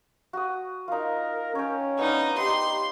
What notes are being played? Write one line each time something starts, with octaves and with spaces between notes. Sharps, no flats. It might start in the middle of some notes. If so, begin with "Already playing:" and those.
F#4 D#6
D#4 F4 A#4
C#4 C#5 G5
B3 D4 D#4
D#4 G4 C6